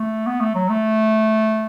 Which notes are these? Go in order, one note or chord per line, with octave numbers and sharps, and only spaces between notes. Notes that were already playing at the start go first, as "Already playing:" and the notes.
Already playing: A3
B3
A3
F#3
A3